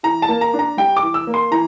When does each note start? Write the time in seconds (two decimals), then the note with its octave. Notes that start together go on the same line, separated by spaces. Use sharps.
0.03 E3 A#5
0.22 A5
0.29 A#3
0.41 A#5
0.54 D4
0.59 A#5
0.77 G3 G5
0.97 D6
1.03 E3
1.14 E6
1.27 A#3
1.34 C6
1.51 E3 A#5